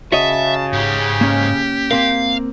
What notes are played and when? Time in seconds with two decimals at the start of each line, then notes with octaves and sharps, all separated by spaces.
0.12 C#3 F#4 C#5 D#5 E5 A5
0.73 G#2 G4
1.21 A#3 C#4
1.91 A#3 C4 A#4 F5